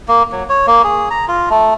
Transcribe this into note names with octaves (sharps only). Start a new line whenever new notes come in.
A#3
F#3
C#5
A#3
G#4
A#5
F4
A3